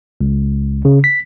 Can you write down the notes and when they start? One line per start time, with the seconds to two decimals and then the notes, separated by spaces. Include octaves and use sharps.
0.21 C#2
0.85 C#3
1.04 B6